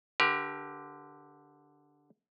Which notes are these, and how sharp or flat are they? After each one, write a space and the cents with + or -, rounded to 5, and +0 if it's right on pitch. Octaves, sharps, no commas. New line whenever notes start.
D3 +0 G4 +0 A#4 +40